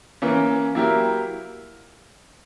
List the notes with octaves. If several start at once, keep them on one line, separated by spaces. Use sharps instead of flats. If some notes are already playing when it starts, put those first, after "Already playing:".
E3 A#3 C#4
F#3 A#3 E4 G4 A#4